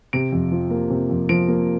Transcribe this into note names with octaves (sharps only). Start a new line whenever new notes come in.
C3 D7
F2
F3
A#3
C3
F2
F3 D7
A#3